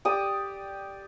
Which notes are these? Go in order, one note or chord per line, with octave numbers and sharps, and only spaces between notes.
G4 D5 D#6